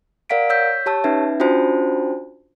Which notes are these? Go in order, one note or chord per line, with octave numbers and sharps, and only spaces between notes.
A#4 D5 F5 F#5 B6 D7
C#5 E6 G6 B6
G4 C#5 A5 E6
C#4 D#4 B4 E5
C#4 D4 F4 F#4 C5 A5